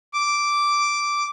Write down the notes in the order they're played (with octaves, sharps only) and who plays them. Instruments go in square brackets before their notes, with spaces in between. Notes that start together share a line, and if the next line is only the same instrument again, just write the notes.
[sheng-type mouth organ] D6